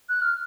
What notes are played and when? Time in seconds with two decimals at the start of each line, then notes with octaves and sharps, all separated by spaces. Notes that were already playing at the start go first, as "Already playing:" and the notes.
0.09 F#6
0.22 F6